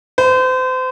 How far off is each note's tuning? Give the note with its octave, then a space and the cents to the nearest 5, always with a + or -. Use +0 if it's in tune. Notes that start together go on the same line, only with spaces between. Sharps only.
C5 -35